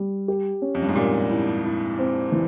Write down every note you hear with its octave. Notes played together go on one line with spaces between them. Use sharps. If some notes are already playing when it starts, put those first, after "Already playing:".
Already playing: G3
G4
C#4
F2
G2
G#2
A#2 G4
E4
E4
C4
E3